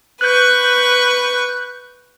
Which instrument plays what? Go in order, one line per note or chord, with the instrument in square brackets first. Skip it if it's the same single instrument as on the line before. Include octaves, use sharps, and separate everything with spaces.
[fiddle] B4 C#6 [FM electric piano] F#6 G6